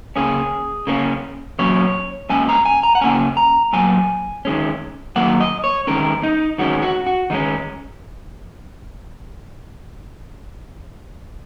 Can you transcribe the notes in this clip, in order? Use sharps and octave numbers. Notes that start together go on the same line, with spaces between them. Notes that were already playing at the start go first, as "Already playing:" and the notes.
C#3 A#3 C#4 G#4
C#3 A#3 C#4
A#2 F#3 C#4 C#5
A#2 G#3 C#4 G#5
A#5
G#5
A#5
F#5
C#3 A#3 C#4 G#5
A#5
A#2 F#3 A#3 G#5
D#3 G#3 C#4
D#3 F#3 A#3 F#5
D#5
C#5
D#3 G#3 C#4 A#4
D#4
D#3 G#3 C#4 F#4
F#4
F#4
D#3 G#3 C#4 D#4